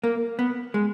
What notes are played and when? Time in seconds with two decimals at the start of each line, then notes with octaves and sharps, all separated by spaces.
0.04 A#3
0.39 B3
0.74 G#3